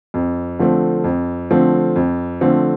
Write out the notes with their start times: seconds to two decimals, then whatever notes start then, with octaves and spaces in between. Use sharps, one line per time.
0.14 F2
0.59 D3 F3 A3 C4
1.04 F2
1.51 D3 F3 A3 C4
1.96 F2
2.41 D3 F3 A3 C4